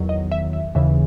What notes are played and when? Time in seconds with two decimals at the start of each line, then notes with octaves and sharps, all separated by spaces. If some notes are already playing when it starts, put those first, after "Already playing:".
Already playing: E2 D#3 F#3
0.09 D#5
0.32 E5
0.53 E5
0.75 D#2 C#3 E3 E5